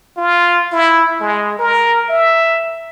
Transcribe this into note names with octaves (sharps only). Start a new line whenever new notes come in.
F4
E4
G#3
A#4
E5